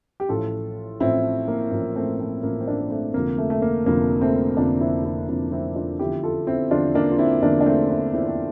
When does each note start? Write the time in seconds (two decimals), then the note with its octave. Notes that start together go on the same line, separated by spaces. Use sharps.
0.20 G4
0.29 A1 A2 F3 F4 A4
1.00 A1 A2 F3 C4 E4
1.48 A#3
1.72 A1 A2 F3 A#3
1.96 A3 C4
2.19 A3 C4
2.43 A1 A2 F3 A#3
2.61 C4
2.67 A#3 D4
2.80 A#3
2.90 A3 C4
3.14 F1 F2 D3 F3 A#3
3.38 A3
3.50 A3
3.62 A#3
3.86 F1 F2 D3 F3 A#3
4.21 A3 C4
4.57 F1 F2 D3 F3 A#3 D4
4.81 C4 E4
5.04 C4 E4
5.28 F1 F2 D3 F3 C4 E4
5.52 C4 E4
5.76 D4 F4
5.99 E2 D3 F3 E4 G4
6.23 F4 A4
6.47 C4 E4
6.71 E2 D3 F3 D4 F4
6.95 A#3 D4
7.12 F4
7.18 C4 E4
7.42 E2 D3 F3 A#3 D4
7.61 D4
7.66 A3 C4
7.90 C4 E4
8.14 E2 D3 F3 C4 E4
8.27 C4